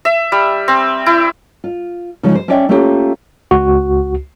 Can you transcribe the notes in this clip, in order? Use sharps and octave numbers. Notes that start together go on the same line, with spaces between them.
E5
G3
C4
E4
F4
C#3 F3 G#3 D#4
C5
C#4 D4 C#5 D5 E5 G5
A3 A#3 C#4 F4 G4
C#2 F#4